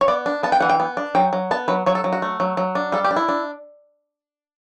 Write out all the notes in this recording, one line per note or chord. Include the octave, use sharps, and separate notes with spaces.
C#5
B3 D5
D4
B3 A5
G5
E3 F#5
G5
B3
D4
F#3 G5
F#3
B3 A5
F#3 B4
F#3 C#5
A4
F#3
F#4
A3
F#3
F#3
D4
G3 A4
G4
D4
E4
D4